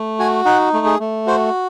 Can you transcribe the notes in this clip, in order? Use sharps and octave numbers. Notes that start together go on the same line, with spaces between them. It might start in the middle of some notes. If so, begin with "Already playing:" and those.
Already playing: A3
F#4 G#5
D#4 F#5
A3
G#4
A3
F#4 C5